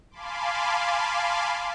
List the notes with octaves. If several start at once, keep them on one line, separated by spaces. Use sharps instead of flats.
F5 G#5 A5 B5 C6 D6